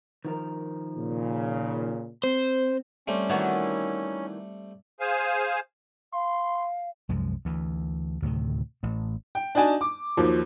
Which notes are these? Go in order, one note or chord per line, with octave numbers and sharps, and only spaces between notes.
D#3 F3 A#4
A#2 C#3
C4 C5
G3 A3 C4 C#4
D#3 E3 F#4
G#4 C5 F5 G#5
F5 C6
C2 F#2 F3 G#3
D2 E3
D2 A2 C3 D#3
A1 A2
G5
D4 D#4 F#4 G#5 A5
D6
D#2 F3 F#3